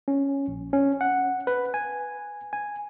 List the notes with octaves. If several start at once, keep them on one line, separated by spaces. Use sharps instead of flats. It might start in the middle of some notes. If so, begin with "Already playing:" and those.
C#4
A#1
C#4
F#5
B4
G#5
G#5